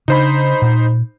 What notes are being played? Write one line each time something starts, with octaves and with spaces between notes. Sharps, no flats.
C#3 D4 D#4 C5 B5
A#2